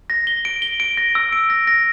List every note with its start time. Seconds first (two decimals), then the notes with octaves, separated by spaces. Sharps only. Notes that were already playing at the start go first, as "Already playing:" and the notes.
0.10 A#6
0.27 G7
0.45 D7
0.62 G7
0.80 D7
0.97 A#6
1.15 E6
1.32 D7
1.50 A#6
1.67 A#6